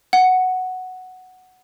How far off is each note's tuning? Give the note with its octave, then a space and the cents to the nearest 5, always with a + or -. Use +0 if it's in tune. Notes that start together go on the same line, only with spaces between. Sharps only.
F#5 +0